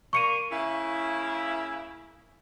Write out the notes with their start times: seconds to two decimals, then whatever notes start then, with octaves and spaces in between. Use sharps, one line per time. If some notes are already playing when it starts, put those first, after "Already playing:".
0.13 A#3 D4 A#4 C#6 C#7 D#7
0.51 C#3 A#3 E4